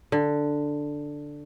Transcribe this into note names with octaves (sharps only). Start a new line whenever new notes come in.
D3